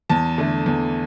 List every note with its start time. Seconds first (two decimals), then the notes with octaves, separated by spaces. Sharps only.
0.09 E2 A5
0.38 D3 A3
0.66 E2